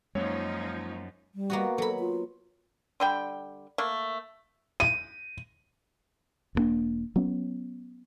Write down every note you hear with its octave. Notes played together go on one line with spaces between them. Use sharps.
F#2 F3 G#3 A#3 D#4 C#5
G3
A#3 B3 F#4
F#3 A4 B5
F4
D3 G3 G5
A3 A#3
D#7
E1 G2 A#3 D4
F#3 B3 C#4